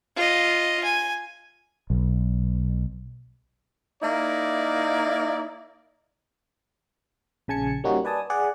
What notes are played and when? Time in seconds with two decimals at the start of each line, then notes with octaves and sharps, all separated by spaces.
0.16 F4 D#5
0.84 G#5
1.90 B1
4.03 A#3 D#4 E4 D5
7.48 A#1 C#3 G#5 A5 G#6 C#7
7.84 G3 A#3 C#4 D#4 F#4
8.05 B4 D5 G#5 A5 D#6
8.30 G#4 D5 F#5